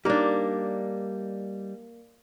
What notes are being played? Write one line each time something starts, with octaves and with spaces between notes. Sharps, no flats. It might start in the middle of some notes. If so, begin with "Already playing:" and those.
G3 A#3 D4 D#4